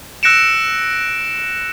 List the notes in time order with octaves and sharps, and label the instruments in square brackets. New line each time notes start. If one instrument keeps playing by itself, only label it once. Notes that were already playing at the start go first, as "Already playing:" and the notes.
[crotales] E6 F#6 A#6 C#7 D7 E7